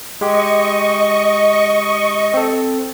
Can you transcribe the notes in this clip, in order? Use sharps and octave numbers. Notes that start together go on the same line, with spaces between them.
G#3 G4 D#5 C#6
C4 A4